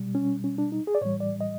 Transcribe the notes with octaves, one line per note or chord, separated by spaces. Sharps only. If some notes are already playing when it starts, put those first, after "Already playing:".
Already playing: B2 G3
C#4
C#4
D4
D#4
G#4
D5
A2 E3 G3 C#5
D5
D#5